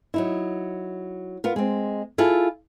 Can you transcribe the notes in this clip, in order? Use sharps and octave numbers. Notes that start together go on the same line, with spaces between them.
F#3 D#4 E4
B3 F4 A#4
G#3 C4
E4 F4 G#4 A4